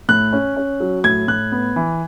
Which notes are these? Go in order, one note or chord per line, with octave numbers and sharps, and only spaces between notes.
A2 F#6
C#4
C#4
F#3
A2 G#6
A2 F#6
B3
E3